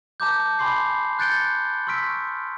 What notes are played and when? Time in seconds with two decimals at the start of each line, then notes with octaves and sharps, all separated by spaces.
0.20 A5 A#5 D6 G6
0.59 G#5 B5 C6 D6 C7
1.19 F#6 G6 A6 C#7 D7 G7
1.87 C6 C#6 E6 F6 B6 D7